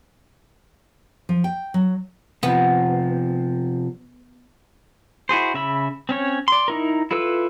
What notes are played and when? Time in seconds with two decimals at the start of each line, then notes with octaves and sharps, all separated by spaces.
1.29 F3
1.44 G5
1.74 F#3
2.43 C3 F3 B3
5.29 E4 F#4 G#4 C5
5.54 C#3 E5 B5
6.09 C4 C#4 C#5
6.48 D5 C6
6.68 D#4 E4 A#4
7.11 E4 F4 A4 B4 E6